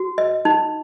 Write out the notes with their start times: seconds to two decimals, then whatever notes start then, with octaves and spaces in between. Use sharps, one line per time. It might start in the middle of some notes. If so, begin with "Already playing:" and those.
Already playing: F#4
0.18 D#5
0.45 D#4